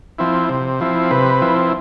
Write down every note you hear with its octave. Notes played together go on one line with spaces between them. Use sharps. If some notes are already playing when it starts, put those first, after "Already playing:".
F3 C4 E4
C3
F3 C4 E4
C3 B4
F3 C4 E4